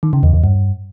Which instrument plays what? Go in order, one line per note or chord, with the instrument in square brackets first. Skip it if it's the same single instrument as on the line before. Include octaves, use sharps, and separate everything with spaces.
[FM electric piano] D#3
C#3
E2
E2
G2